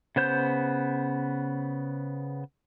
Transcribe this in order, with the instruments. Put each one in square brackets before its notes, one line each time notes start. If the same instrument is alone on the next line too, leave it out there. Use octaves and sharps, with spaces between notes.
[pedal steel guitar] C#3 B3 C5 G6